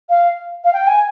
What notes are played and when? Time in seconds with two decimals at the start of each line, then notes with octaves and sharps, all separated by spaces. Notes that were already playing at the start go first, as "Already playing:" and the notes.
0.09 F5
0.64 F5
0.73 G5
0.87 G#5